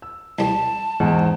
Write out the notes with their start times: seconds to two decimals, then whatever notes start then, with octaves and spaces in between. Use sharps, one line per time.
0.02 E6
0.39 C2 G3 A5
1.00 E2 G#2